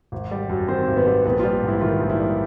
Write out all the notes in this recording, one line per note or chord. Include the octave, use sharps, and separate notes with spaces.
G#1
G3
F#2
D#3 C4 C5
G#1
B3 B4
G3
A#1 B3 B4
F4
G3
G#2 E4
D#3 F4
A#1
E4
G3